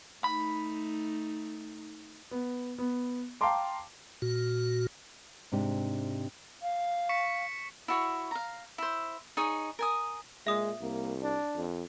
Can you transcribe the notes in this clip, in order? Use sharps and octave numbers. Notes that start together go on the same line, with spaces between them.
A3 D#4 B5
B3
B3
F5 G5 A5 A#5 C6 D6
A#2 F#4
G#2 C3 D4 G4
F5
C#6 B6 C#7
E4 F#4 C#5
F5 A#5
E4 C5
D#4 G#4 C#5
A#4 G#5 D#6
A#2 G#3 E5 D#6
C2 A#3
D4
F2